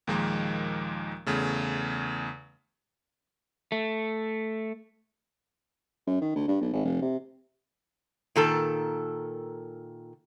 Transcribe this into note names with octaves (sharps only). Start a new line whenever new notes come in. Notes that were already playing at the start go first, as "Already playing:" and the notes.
D#2 A#2 D#3 F3 G#3 A#3
E2 C#3 A3
A3
F#2
D#3
D2
G2
B1
G#1
F1
C3
A#2 D#3 A4